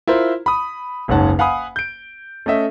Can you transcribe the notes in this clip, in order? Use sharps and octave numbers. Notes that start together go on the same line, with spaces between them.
E4 F4 A#4 C5
B5 D#6
F#1 C#2 G#2 C#5 F#5 A5
F5 F#5 G#5 B5 D#6
G6 D7
A3 C#4 D#5 E5